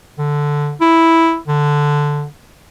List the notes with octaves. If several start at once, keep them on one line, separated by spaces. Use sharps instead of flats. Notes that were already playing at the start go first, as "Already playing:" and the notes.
D3
E4
D3